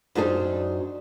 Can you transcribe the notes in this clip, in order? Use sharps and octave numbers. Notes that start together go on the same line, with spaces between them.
F#2 D4 D#4 G#4 C5